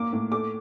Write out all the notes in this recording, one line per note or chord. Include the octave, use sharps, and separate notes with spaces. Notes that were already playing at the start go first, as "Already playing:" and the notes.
Already playing: A#3 D6
A2
A3 D6